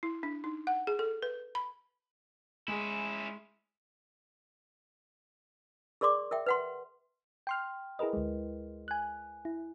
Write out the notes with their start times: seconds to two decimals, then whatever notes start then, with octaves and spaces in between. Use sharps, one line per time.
0.03 E4
0.23 D4
0.44 D#4
0.67 F#5
0.87 G#4
0.99 A4
1.22 B4
1.55 B5
2.68 G#3 C#4 E4 G#4
6.01 G#4 A#4 D5 C6 D6
6.31 A#4 E5 G5
6.46 B4 F#5 C6
7.47 G5 C6 F6
7.99 E4 G#4 A#4 B4 D#5
8.13 D2 G#3
8.88 G#5 F#6
9.45 E4